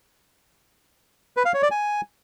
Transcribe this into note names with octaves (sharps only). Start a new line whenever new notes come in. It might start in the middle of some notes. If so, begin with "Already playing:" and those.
B4
F5
C#5
D5
G#5